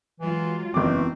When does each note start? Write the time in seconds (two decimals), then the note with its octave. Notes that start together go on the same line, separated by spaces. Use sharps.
0.20 E3 F#3 G#3 F4
0.74 F#1 E2 E3 C4 D6